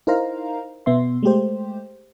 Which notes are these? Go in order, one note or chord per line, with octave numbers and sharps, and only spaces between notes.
D#4 E4 A#4 C5 F5 A#5
B2 B3 E5 C6
G#3 A3 G4 C5